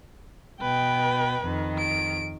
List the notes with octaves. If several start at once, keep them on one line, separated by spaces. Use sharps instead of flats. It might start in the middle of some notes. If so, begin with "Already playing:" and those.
B2 B4 G5
F2 D#3
D7